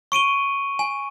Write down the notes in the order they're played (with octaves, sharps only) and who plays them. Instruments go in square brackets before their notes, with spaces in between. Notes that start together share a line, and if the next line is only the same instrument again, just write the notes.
[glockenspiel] C#6 D7 D#7 G7
G#5